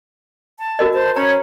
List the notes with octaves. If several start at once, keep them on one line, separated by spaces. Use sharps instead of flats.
A5
F#4 A#4 D#5
C5 A5
C#4 C#5 A#5 B5